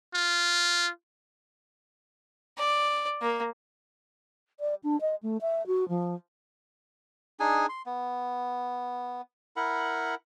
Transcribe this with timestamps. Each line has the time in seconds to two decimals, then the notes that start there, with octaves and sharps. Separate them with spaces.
0.15 F4
2.58 D5
3.22 A#3
4.60 D5
4.84 D4
5.01 D#5
5.23 A3
5.41 E5
5.67 F#4
5.89 F3
7.40 D4 D#4 G#4 G#5
7.69 C6
7.86 B3
9.56 E4 A#4 F#5 B5